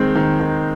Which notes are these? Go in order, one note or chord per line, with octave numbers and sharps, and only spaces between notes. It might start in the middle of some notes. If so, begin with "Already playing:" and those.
Already playing: D#3 G#3 C4
D#3
D#3